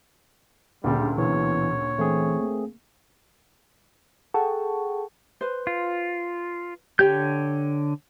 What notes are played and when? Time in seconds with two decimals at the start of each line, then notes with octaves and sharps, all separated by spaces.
0.84 D2 A#2 C#3 G3
1.18 B2 E3 C#5
1.99 E3 A3 C4 G#4
2.41 A#3
4.34 G#4 A4 F#5 G5 A5 C#6
5.41 B4 C5
5.67 F4
6.99 D3 G4 C#5 G6